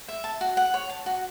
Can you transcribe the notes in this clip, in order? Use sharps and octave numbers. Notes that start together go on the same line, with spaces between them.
E5
A5
F#4
F#5
C#5
A5
F#4